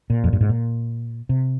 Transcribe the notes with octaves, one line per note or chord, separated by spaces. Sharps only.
A#2
F2
G2
G#2
A#2
C3